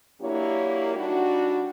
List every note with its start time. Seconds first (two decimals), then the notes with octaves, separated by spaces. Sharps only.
0.21 F#3 A#3 D4 E4 G4 C#5
0.95 G3 D4 D#4 F#4